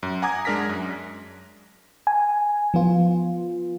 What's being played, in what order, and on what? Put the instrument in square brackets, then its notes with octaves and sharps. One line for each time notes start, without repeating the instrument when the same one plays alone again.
[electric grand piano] F#2
F#5 G#5 A#5 D6 D#6 G#6
G#3 D4 A#4 A#6 B6
F#2
[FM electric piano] G#5
F3 B3 F4